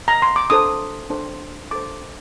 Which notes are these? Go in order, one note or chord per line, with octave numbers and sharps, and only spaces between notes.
A#5
C6
D6
D4 A4 C5 D#6
D4 A4 C5
D4 A4 C5 D6